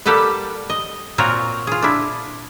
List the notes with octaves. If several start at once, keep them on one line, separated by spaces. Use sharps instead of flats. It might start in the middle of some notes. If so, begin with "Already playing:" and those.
G3 A#3 G4 A4 B4 F#5
D#5
A#2 C4 F4 F#4 A#4 C#5
F4 G#4
D4 E4